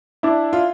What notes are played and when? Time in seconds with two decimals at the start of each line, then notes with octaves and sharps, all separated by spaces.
0.23 D4 E4
0.53 F4